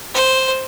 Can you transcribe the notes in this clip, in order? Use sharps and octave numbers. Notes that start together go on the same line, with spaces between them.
C5